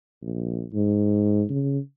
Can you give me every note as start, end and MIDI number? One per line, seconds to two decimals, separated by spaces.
0.22 0.64 34
0.73 1.44 44
1.50 1.78 49